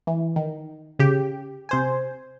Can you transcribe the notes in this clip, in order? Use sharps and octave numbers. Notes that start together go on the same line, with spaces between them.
E3
D#3
C#3 G4
C3 C5 G#5